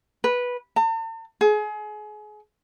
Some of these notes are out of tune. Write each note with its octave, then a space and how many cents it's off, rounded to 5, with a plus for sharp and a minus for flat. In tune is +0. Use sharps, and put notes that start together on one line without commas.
B4 -10
A5 +45
G#4 +30